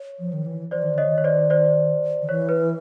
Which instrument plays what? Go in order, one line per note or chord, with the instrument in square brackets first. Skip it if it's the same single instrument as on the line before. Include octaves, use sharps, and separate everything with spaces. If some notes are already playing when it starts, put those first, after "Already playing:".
Already playing: [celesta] C#5
[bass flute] F3
D#3
E3
[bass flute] E3 [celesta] C5 D5
[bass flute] D#3
[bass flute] D3 [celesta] C#5 D#5
[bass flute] D#3
[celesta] C#5
C5 D5
C5 D5
[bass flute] D#3
[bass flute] E3 [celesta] C#5
[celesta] B4